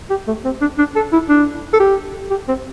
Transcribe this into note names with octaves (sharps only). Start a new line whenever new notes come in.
G4
A3
C4
D4
D4
A4
E4
D4
A4
G4
G4
C4